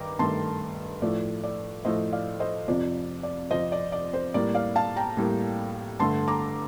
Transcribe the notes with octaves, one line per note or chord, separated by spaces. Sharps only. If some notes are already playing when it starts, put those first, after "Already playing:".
Already playing: G2 D#3 G5 A#5 D6
G2 D#3 A3 A5 C6
A2 F3 A3 D5
D5
A2 F3 A3 C5 D#5
D5 F5
C5 D#5
F2 C3 F3 D5
D5
F2 C3 F3 C5 D#5
D5
D5
C5
A2 G3 A#3 D5
D5 F5
F5 A5
G5 A#5
A2 G3 A#3
G2 D3 A3 A5 C6
A#5 D6